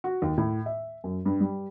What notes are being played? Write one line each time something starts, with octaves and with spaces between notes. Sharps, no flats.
F#4
D#2
A2
E5
F#2
G2
G3